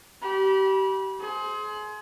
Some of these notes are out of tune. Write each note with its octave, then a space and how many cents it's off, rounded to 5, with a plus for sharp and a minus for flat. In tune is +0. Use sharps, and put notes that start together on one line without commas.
G4 -30 B5 -30
G#4 +30 C5 +0